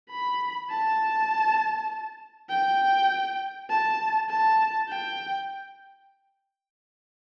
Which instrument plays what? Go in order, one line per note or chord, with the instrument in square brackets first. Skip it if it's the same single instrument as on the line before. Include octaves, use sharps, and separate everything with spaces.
[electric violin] B5
A5
G5
A5
A5
G5